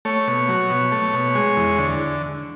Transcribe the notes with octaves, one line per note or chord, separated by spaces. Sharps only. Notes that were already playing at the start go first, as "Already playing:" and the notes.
A3 C#5
B2
F#3
B2
A3
B2
G#3
E2
D3